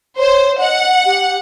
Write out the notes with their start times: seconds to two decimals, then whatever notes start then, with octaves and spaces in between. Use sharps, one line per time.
0.19 C5 C#5
0.61 D#5 F#5
1.06 G4